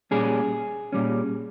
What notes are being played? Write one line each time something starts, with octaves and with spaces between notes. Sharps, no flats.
A#2 G3 C#4 G#4
A#2 G3 C#4